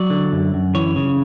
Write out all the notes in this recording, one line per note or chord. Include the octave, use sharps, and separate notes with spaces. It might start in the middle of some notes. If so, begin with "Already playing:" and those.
Already playing: F#3 D5
D3
F#2
F#2
E3 C#5
C#3